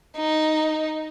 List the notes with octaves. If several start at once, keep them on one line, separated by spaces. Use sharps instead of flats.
D#4